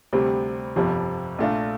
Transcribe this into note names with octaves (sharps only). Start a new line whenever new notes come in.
D2 C3 G3 C4
G1 F2 C3 F3
A#1 A#2 A3 D4 F4